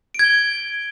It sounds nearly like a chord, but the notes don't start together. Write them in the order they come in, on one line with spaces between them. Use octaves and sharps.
D7 G#6 G7